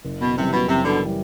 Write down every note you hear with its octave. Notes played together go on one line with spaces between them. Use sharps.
F#1
B2
F#2 C3 E3 G3
B2
F#1 C3
B2 D3
E3 G3